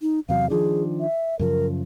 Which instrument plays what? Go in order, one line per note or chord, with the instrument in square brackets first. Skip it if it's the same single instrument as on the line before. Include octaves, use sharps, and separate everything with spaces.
[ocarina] D#4
[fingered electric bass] E2 C3 F#3 [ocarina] F5
[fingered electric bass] D#3 F3 D4 [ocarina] G#4
[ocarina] E5
[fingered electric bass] F#2 C#3 F3 [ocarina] A#4